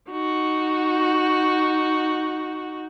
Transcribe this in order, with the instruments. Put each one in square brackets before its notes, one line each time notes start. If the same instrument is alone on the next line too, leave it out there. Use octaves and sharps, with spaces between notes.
[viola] D#4 F#4